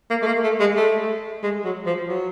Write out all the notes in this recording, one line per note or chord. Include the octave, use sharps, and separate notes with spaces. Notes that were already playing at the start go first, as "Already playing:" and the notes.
A#3
A3
A#3
A3
G#3
A3
G#3
F#3
F3
F#3